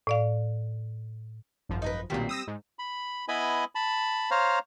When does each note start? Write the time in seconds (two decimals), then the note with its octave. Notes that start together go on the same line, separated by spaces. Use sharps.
0.07 A2 D5 F5
1.69 G#1 F#2 F3
1.82 D#4 A#4 B4
2.10 B1 A#2 D#3 G3 C4
2.29 D#6 E6 A#6
2.47 G#2
2.79 B5
3.28 B3 E4 B4 D#5 G#5 B5
3.75 A5 B5
4.31 C5 C#5 F5 A#5